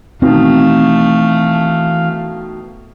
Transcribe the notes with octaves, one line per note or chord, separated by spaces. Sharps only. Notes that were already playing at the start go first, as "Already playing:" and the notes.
B2 D#3 E3 A3 C4 F5